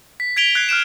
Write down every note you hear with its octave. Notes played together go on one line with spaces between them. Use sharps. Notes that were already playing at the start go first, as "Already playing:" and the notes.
B6
G#6 B6 D7 F7 G7
F#6 G#6 C7 D7
F6 F#6 D7 E7